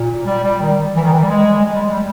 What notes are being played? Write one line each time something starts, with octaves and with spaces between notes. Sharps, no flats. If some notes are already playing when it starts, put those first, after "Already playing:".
Already playing: A#2
G3
G3
D#3
E3
D#3
E3
G3
G#3
G#3
G3
G#3
G3